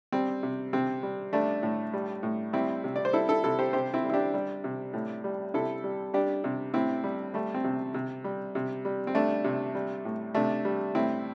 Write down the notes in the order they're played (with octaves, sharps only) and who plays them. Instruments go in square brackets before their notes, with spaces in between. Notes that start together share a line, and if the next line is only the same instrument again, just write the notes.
[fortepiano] G3 C4
C3
C3 C4
G3
G3 A3 D4
A2
G3
A2
G3 C4 E4
C3
D5
C5
G3 E4 A4
E4 A4
C3 E4 A4
G4 C5
C3 G4 C5
C4 E4
G3
E4
D4 G4
G3
C3
A2
G3
C3 E4 A4
G3
G3 D4 G4
C3
A2 C4 E4
G3
G3 A3
C4
C3
C3
G3
C3
G3
C4
G3 A3 D4
C3
G3
A2
C3 A3 D4
G3
A2 C4 E4